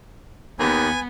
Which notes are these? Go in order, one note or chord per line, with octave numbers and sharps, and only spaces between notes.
D#2 B3 G#5